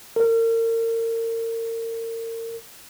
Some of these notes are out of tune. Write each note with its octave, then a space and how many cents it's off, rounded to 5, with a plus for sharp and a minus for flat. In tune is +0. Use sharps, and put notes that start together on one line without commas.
A#4 -35